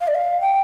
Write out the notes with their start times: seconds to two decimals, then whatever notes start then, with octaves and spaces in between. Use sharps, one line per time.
0.01 F5
0.08 D5
0.14 F5
0.41 G5